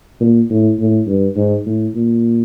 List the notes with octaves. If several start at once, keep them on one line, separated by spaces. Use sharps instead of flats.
A#2
A2
A2
G2
G#2
A2
A#2